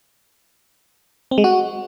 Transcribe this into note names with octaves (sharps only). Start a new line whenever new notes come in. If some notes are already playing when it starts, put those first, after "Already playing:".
C4
G#3
F#4